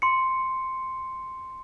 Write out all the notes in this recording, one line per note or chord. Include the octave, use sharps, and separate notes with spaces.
C6 C#7